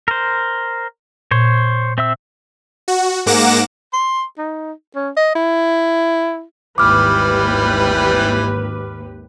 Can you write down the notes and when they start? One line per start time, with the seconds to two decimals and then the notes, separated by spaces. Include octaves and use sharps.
0.08 A#4 C5
1.31 A#2 C5 C#5
1.98 C4 E5 E6
2.88 F#4
3.26 G#2 A#3 F#5 D6 A#6 E7
3.93 C6
4.38 D#4
4.95 C#4
5.17 D#5
5.35 E4
6.78 G#1 D#2 E3 G3 G4 B4 D6 F6